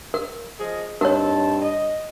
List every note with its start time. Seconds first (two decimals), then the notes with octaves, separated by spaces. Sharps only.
0.14 A#4
0.59 F3 G#4 D#5
1.01 G2 C4 D#4 A#4 C#5 A5
1.62 D#5